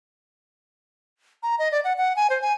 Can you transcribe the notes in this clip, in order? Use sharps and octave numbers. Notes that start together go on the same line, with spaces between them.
A#5
D#5
D5
F#5
F#5
G#5
C5
G#5